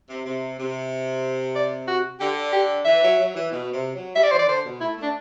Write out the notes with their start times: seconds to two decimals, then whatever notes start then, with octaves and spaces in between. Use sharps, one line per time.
0.09 C3
0.25 C3
0.58 C3
1.56 D5
1.88 F#4
2.20 D3 G4
2.53 G4
2.85 E3 E5
3.02 F#3
3.19 F#3
3.34 E3
3.51 B2
3.72 C3
3.94 F#3
4.16 G3 E5
4.23 D5
4.31 E3 C5
4.39 D5
4.48 D3 C5
4.64 B2
4.80 A3 E4
4.97 A3
5.03 D4